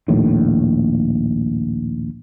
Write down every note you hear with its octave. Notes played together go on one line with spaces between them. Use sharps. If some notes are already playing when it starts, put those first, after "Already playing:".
A#1 D#2 A2